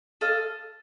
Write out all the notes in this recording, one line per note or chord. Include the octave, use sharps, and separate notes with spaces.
A4 D#5 F5